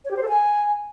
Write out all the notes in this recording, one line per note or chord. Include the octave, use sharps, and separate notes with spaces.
C#5
G4
C5
A4
G#5